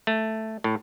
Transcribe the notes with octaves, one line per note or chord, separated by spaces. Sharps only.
A3
A2